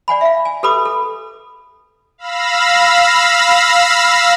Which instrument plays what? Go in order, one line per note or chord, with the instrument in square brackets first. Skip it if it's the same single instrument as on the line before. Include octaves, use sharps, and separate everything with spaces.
[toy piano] D5 F#5 G#5 B5
E5 F5
G#5
G4 A4 B4 B5 D6 D#6
A4
[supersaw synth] F5 B5 E6 A#6